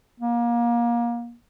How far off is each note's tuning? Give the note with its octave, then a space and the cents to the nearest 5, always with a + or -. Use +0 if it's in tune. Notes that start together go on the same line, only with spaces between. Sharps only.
A#3 +25